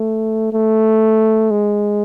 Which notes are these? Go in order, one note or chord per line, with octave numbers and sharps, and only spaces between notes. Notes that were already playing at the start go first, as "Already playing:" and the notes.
Already playing: A3
A3
G#3